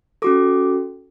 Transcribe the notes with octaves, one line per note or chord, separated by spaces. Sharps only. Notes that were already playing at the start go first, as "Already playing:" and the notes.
C#4 F#4 A4 D6